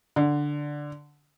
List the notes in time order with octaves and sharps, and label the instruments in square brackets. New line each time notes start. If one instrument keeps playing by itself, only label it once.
[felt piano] D3